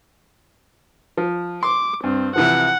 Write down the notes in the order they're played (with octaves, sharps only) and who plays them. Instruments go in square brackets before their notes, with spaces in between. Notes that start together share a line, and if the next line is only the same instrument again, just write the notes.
[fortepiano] F3
[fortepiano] C6 [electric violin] D6
[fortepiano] G2 [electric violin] C4
[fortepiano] C3 E3 F3 [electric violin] F#5